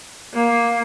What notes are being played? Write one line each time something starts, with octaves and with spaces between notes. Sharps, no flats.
A#3